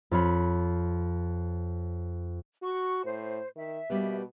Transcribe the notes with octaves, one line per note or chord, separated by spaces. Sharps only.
F2 F4 C#5 B5
F#4 C#6
A2 C5
D#3 E5
B2 G3 A#3 B3